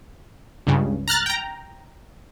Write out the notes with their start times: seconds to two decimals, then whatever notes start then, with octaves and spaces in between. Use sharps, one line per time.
0.67 C#2 G2 C#3
1.08 A#5 F6 F#6 A6
1.26 G5 A#5